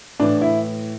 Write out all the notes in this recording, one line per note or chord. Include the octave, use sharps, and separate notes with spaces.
A2 E3 D4
E4